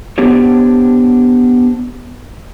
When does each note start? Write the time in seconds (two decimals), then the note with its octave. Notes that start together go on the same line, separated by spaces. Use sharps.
0.18 B3 D4 G4 C5 C#5